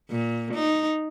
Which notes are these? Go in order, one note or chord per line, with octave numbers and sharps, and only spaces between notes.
A#2
D#4